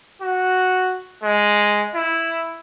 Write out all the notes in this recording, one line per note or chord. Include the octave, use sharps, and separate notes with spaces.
F#4
G#3
E4